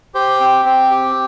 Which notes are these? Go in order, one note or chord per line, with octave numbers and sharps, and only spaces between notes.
G4 C5
C4
C4
G4